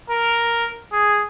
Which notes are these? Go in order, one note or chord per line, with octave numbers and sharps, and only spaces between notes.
A#4
G#4